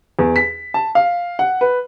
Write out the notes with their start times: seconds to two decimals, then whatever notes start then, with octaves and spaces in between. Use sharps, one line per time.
0.19 E2
0.36 B6
0.74 A5
0.95 F5
1.39 F#5
1.61 B4